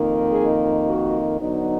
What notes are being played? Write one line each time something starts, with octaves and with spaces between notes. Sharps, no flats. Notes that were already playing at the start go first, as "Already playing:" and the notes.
Already playing: F2 D#3 A#3 D#4
G#4
F#4
D3 F#3 B3 D#4